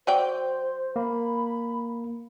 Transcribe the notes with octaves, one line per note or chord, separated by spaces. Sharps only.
F#3 C5 D5 G5
A#3 B5